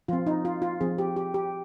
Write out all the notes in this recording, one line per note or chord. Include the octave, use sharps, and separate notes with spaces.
F3 C4 F4
D#4
F4
F4
F3 C4 G#4
G4
G4
G4